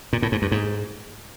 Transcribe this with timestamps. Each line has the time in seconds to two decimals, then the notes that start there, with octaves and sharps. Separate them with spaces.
0.13 A#2
0.22 A2
0.32 G#2
0.42 G2
0.52 G#2